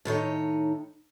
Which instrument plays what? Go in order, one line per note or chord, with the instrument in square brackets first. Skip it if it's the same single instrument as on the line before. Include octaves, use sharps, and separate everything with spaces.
[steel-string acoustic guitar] A2 D#3 D#4 C#5